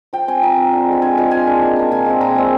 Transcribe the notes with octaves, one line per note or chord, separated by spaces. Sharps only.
F3 G5
C4 G#5
F3 A#5
C4
D3
F3 G#3
D3 G#5
F3 G#3 F5
D#3 G#5
A#3 D4
D#3
A#3 D4
A#2 G#5
G#3 C4
A#2 A#5
G#3 C4